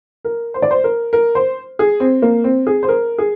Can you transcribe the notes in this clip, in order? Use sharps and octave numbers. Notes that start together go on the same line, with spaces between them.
A#4
C5
D5
C5
A#4
A#4
C5
G#4
C4
A#3
C4
G#4
C5
A#4
G#4